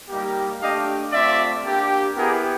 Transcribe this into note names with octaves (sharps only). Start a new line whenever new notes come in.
G3 A#3 D#4 G4
A3 D4 G4 D#5 F5
A3 C4 F4 D5 E5
A#3 D4 G4
B3 E4 G4 G#4 A#4